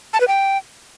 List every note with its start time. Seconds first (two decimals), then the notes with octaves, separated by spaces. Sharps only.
0.13 A5
0.21 B4
0.28 G5